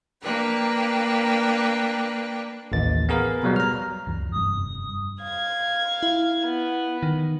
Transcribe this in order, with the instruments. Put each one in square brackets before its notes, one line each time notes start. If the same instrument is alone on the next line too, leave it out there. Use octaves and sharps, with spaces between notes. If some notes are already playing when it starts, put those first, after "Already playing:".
[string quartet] A#3 D4 B4 G5
[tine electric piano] A1 D#2 A6
B3 G#4 A#4 B4 F5
B2 F#3 G3
A#5 F6
[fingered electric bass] C#2 F#2 E3
[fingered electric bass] F1 G2 [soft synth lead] D#6
[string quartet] F5 G#6
[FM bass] E4
[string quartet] B3
[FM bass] D#3